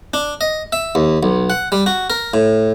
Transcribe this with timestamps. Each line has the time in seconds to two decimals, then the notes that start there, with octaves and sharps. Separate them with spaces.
0.14 D4
0.41 D#5
0.73 E5
0.95 D#2
1.23 B1
1.50 F#5
1.72 G3
1.86 F#4
2.10 A#4
2.34 A2